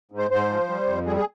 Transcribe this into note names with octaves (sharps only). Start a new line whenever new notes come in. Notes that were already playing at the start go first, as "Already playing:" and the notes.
G#2
C5
G#2 C5
F3
G3
F2
G3 G#4
G#4